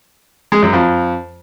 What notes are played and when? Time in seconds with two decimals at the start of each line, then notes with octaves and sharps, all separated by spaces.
0.52 G#3
0.63 F#2
0.73 F2